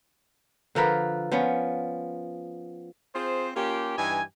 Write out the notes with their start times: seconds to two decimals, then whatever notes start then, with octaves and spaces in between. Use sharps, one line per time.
0.75 D3 F3 A#4 B4
1.32 F3 B3 C#4
3.15 C4 F4 G#4 C5
3.56 A#3 C#4 F4 G4
3.98 G2 E3 D#4 G4 G#5